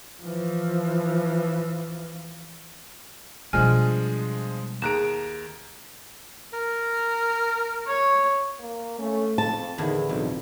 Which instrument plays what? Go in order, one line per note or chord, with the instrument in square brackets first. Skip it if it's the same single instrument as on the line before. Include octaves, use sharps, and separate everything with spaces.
[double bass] E3 F3
[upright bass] B2 G3 [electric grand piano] F3 G#3 D4 [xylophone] G#5 F6
[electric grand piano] D#2 A#5 D7 [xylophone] G#4 F#6 E7
[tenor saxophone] A#4
[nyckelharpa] C#5
[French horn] A#3
[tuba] A3 [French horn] C#4
[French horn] F2 [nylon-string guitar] A5
[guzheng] E2 A2 D3 [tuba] D#3 [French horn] E4
[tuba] B1 [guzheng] F2